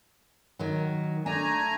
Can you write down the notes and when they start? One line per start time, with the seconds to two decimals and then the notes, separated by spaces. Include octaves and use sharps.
0.59 D#3 F#3
1.26 A3 D4 G#5 A#5